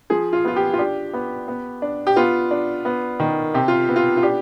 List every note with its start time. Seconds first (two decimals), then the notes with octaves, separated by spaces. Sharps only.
0.10 F3 G#4
0.33 F4
0.45 B3 F4
0.56 G4
0.73 F4
0.79 D4 G4
1.14 B3
1.48 B3
1.82 D4
2.07 G4
2.16 B3 F4
2.51 D4
2.85 B3
3.20 D#3
3.54 C3 G4
3.68 F4
3.89 B3
3.96 F4
4.17 F4
4.23 D4 G4